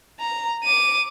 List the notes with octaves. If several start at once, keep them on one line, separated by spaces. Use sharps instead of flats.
A#5
D6 D#7